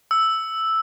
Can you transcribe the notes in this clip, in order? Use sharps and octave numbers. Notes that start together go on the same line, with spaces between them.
E6